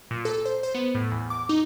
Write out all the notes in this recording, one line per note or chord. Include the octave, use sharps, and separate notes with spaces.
A#2
A4
C5
C5
B3
A2
E2
D6
D#4